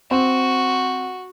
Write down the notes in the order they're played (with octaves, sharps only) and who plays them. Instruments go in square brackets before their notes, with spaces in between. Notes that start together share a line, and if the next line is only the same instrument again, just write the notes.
[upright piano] C4 [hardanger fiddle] F#4